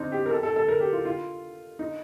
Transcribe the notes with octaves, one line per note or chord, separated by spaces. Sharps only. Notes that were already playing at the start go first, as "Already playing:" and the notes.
Already playing: C4 D4 D#4
G4
A#4
A4
A4
A4
A#4
G4
F4
F4
D#4